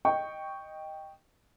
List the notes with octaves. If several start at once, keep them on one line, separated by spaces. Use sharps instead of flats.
D#5 G5 C#6